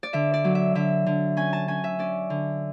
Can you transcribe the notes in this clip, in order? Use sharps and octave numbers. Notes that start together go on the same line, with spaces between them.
D5
D3 E5
D5
F#3
E5
D3 E5
D3
C#4 G#5
A5
C#4 G#5
E5
C#4 D5
D3